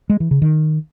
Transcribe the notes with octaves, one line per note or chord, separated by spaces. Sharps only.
G#3
E3
C#3
D#3